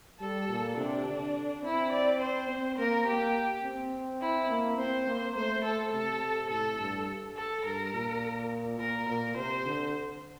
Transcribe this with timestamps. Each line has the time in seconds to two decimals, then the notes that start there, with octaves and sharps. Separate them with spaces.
0.20 G3 A4
0.49 A#2
0.77 C3 D4
1.06 D3
1.63 C4 E4
1.92 D5
2.21 C5
2.49 C4
2.78 A#3 A#4
3.07 A#3 G4
3.63 C4
4.21 E4
4.49 A#3
4.78 C4 C5
5.07 A#3
5.36 A3 C5
5.65 A4
5.93 C3 A4
6.50 A2 A4
6.79 G2
7.37 A4
7.65 G2 A#4
7.94 A#2
8.79 A#2 A#4
9.08 A#2 A#4
9.36 C3 C5
9.65 D3